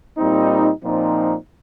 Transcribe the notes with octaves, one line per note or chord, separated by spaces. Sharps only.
A#2 G3 C4 D#4
A#2 F3 C4 D#4